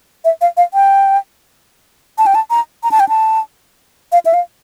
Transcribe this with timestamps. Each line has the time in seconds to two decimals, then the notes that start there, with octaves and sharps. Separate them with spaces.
0.25 E5
0.41 F5
0.57 F5
0.74 G5
2.18 A5
2.26 G5
2.35 A5
2.50 A#5
2.83 A#5
2.91 A5
3.00 G5
3.09 A5
4.12 F5
4.25 E5
4.34 F5